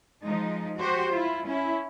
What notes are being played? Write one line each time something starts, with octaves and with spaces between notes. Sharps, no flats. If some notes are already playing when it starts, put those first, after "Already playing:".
F3 G#3 D#4
F#4 G4 C5
E4 F4
C#4 E4